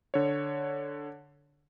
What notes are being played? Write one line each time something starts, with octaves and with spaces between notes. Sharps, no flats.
D3 C#5